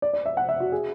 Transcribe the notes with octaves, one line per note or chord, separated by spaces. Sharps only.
D5
D5
E5
F#5
E5
F#4
G#4